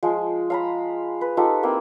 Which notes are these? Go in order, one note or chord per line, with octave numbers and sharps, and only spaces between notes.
F3 G#3
F5 A#5 B5
B4
D#4 F4 G4 A4
A#3 C4 E4